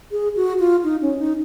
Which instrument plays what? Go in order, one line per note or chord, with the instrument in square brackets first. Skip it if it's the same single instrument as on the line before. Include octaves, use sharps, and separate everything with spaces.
[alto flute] G#4
F#4
F4
D#4
C#4
D#4